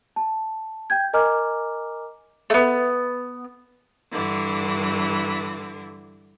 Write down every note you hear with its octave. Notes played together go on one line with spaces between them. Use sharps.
A5
G5 G6 G#6
A#4 D#5 G#5 A#5 D6 F6
A3 B3
G2 D3 E3